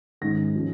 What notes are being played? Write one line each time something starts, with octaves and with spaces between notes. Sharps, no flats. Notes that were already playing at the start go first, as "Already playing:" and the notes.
G#2 D#3 G#3 C#4 A#6
F3 G#3 C#4